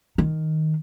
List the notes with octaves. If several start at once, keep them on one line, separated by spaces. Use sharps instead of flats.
D#3